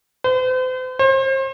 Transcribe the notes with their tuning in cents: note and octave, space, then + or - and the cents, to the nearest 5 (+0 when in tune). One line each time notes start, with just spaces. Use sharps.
C5 -40
C5 +40